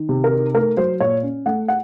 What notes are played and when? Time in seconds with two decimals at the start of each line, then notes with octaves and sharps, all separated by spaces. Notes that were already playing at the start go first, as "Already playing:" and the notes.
Already playing: D#3
0.09 C3
0.24 A#4
0.31 D#4
0.54 A3 A#4
0.77 F#3 C5
1.00 A#2 C#5
1.23 C#4
1.46 A3 F#5
1.68 F#5